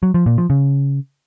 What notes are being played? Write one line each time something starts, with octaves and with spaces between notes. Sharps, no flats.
F#3
F3
A#2
F3
C#3